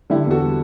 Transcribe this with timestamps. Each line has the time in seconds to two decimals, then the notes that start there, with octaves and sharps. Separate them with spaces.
0.10 D3 E4 G4
0.26 E2 F#4 A4
0.42 G3